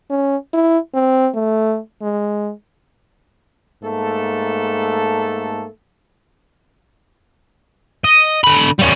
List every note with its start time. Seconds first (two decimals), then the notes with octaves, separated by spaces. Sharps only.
0.10 C#4
0.53 E4
0.94 C4
1.34 A3
2.02 G#3
3.82 G#2 A3 A#3 A4
8.04 D#5
8.44 D3 B5
8.79 G3 C#4